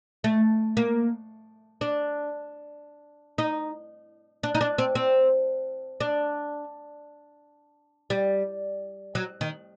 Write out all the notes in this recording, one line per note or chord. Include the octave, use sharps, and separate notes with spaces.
A3
A#3
D4
D#4
D4
D#4
D4
C4
C4
D4
G3
F#3
D#3